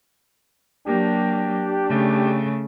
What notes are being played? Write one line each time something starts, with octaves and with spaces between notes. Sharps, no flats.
F#3 A#3 D4 G4
C#3 A3